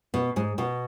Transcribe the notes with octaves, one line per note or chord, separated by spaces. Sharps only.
B2 B3
G#2 G#3
B2 B3